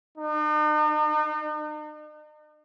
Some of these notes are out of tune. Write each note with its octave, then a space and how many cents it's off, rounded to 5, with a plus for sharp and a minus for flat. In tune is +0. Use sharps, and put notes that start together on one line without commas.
D#4 -45